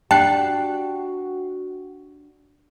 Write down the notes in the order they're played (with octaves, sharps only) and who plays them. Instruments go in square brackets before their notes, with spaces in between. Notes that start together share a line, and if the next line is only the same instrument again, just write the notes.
[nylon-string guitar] D4 G4 D5 [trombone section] F#4 [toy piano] G5 [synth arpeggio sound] A5 F#6 C7